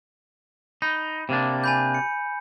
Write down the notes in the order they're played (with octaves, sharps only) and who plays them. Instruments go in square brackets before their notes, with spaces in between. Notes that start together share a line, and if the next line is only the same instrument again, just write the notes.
[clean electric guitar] D#4 [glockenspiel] B5
[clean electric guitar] C3 A#3 D4
[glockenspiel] G#5 B5 G6
C#7